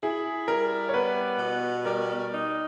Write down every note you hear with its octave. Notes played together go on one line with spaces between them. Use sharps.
E4 G#4
G3 A#4
C#5
B3 B4
B2
G3 A#4
D#4